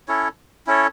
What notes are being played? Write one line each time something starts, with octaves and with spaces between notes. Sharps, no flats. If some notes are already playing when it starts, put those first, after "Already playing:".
C#4 E4 A4 C#5
C#4 E4 A4 C#5